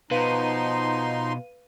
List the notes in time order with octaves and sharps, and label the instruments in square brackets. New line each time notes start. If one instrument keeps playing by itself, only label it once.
[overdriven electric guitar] B2 [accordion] F3 D#4 C6 [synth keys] B4 F5 D#7